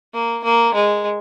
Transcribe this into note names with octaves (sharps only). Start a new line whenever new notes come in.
A#3
A#3
G#3